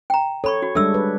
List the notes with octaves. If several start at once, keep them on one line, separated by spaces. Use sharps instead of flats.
G5 A#5
A4 C#5 B5 C#6
F#4
G3 G#3 D4 A4 E5 E6
B4